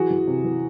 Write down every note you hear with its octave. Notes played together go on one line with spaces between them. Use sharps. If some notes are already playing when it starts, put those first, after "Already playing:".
Already playing: E3 F#4 G#4
E3
C3
E3